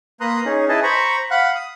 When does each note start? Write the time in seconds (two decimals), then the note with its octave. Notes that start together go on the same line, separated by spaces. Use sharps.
0.21 A#3 B4 A#5 C6 D#6 F#6
0.45 C#4 D#4 G#4
0.68 E4 G#4 B4 D#5 A5
0.83 C5 A#5 B5 C#6
1.31 F5 F#5 B5 F#6
1.55 D#6